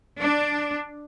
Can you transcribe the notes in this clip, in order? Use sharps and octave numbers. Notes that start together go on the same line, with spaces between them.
D4